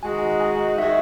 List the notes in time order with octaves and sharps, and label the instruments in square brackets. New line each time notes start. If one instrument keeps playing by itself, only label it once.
[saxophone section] D#3 G#3 D#4 F#4 [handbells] G#5
[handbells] G#5
[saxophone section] D#3 G#3 D#4 F#4 [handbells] E5